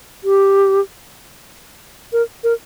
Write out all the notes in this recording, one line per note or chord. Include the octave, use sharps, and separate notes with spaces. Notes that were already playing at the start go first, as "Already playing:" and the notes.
G4
A#4
A#4